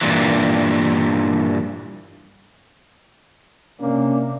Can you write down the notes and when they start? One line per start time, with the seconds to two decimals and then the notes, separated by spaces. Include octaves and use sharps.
0.01 G2 A#2 E3
3.80 C3 A#3 C#4 D4